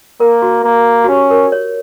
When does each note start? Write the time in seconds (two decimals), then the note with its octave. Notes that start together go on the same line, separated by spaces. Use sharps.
0.20 A#3 A#4
0.42 F#4
0.64 A#3
1.04 F#4
1.08 C#4 G4
1.30 A#4
1.52 C#5